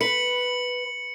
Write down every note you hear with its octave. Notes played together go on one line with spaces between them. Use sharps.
B4 C#7 F#7